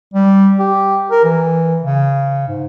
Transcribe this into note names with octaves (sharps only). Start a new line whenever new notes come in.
G3
G4
A#4
E3
C#3
G#2